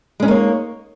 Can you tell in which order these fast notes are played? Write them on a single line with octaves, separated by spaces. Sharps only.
G#3 C#4 D#4 A#3 C#5